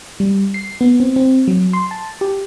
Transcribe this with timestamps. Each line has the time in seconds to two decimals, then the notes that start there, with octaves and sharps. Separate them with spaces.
0.20 G3
0.54 C7
0.81 B3
1.00 C4
1.16 C4
1.48 F#3
1.73 C6
1.91 A5
2.21 G4